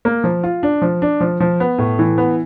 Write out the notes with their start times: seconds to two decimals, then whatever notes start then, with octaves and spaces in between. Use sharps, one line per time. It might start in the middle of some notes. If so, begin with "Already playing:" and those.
0.05 A#3
0.24 F3
0.43 F4
0.63 D4
0.82 F3
1.02 D4
1.20 F3
1.40 F3
1.60 B3
1.78 A2
1.99 E3
2.18 B3